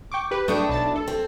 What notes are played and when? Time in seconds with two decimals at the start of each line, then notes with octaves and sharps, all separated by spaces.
0.12 G5 C#6 D6
0.31 G4 B4
0.48 A3 D4 E4 G5 C#6 D#6
0.69 B1 A5 A6
0.96 A4
1.08 C4